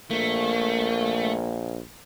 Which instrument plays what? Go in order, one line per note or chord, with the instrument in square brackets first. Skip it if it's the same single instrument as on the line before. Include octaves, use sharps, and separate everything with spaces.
[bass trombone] A#1 [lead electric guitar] A3 [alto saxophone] A#3